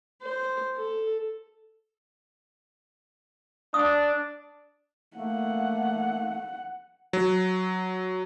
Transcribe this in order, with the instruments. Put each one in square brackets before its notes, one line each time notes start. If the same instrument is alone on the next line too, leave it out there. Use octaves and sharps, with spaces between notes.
[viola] C5
A4
[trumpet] D4 [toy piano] D#6
[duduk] A3 [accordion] A#3 [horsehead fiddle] F#5
[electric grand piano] F#3